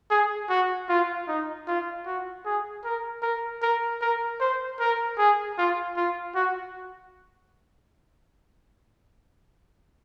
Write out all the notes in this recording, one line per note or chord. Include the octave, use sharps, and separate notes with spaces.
G#4
F#4
F4
D#4
F4
F#4
G#4
A#4
A#4
A#4
A#4
C5
A#4
G#4
F4
F4
F#4